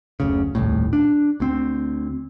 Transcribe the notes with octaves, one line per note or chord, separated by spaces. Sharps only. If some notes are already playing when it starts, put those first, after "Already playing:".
F#1 D2 C#3
D#1 C2 A2
D4
D2 C4